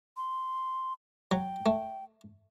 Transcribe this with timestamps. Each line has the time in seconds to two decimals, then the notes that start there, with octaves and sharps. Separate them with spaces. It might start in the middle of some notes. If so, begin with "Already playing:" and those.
0.17 C6
1.31 F#3 G5
1.66 A3